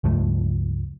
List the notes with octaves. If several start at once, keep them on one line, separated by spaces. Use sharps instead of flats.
C#2 G2 F3 A3